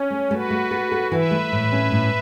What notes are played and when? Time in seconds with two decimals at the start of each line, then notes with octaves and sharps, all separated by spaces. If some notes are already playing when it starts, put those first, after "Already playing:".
Already playing: C#4
0.10 A3
0.30 A3 F#4 B4
0.50 A3
0.71 A4
0.92 A4
1.11 E3 B4 E5
1.31 A3
1.52 A2
1.72 C#4
1.92 A2